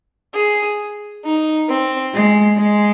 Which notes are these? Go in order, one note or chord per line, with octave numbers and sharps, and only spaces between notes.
G#4
D#4
C4
G#3
G#3